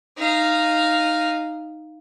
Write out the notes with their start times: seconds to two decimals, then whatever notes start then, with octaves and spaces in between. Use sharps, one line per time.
0.18 D#4 F5